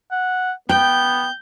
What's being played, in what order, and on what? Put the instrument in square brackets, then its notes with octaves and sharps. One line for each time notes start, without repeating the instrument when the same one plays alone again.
[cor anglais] F#5
[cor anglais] B3 [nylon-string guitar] G5 [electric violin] G6